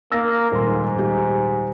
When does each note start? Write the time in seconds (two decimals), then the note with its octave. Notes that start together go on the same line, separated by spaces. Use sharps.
0.12 A#3 E6 A6 A#6
0.52 D#1 G#2 C6
0.95 D#1 G4